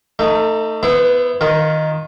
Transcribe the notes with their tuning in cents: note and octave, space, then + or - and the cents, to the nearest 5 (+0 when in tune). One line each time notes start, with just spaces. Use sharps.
A3 +30 D#4 +0
B3 -5 E4 +0 C5 -35
D#3 +0 F4 +25